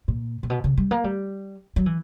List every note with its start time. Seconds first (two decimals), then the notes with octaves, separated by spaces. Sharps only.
0.08 A#2
0.43 A#2
0.50 B2
0.64 C#3
0.77 G3
0.91 A#3
1.04 G3
1.76 F#3
1.86 E3